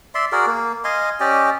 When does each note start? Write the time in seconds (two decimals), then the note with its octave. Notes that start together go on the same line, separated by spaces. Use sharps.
0.15 D5 E5 C6
0.32 F#4 G#4 A#4 D5
0.47 A#3
0.84 D#5 F5 G#5 C6
1.20 C#4 G4 D5 D#5